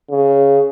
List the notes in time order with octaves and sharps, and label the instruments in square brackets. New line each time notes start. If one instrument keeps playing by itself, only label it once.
[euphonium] C#3